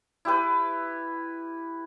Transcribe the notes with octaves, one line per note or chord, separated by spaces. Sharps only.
E4 G4 B4